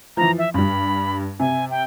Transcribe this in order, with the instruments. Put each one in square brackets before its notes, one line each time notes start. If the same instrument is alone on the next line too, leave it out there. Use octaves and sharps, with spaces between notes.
[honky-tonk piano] E3 F3 [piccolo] A#5
[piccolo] E5
[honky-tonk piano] G2 G3 [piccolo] B5
[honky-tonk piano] C3 [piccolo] G#5
[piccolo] G5